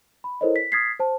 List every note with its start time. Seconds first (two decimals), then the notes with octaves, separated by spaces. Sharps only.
0.24 B5
0.41 E4 A4 A#4 C5 C#5 D#5
0.56 B6
0.72 D#6 F6 G#6 A6 B6 C7
1.00 C5 A5